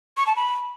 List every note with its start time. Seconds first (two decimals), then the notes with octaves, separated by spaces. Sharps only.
0.17 C#6
0.27 A5
0.36 B5